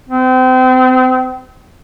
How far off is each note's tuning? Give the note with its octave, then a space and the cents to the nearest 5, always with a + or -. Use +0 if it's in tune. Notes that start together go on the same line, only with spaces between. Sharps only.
C4 -35